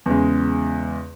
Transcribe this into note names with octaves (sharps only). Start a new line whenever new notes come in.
E2 C#3 G#3